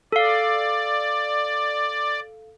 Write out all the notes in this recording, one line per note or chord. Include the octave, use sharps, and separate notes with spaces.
A4 D5 F5